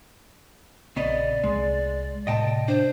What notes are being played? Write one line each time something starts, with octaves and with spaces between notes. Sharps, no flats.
A#1 C#3 B3 C4 D5 D#5
C2 G#3
A2 C3 A#3 D#5 G5 A5
D4 C5